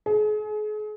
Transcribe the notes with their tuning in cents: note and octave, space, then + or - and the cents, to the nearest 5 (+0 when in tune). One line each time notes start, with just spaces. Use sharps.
G#4 +35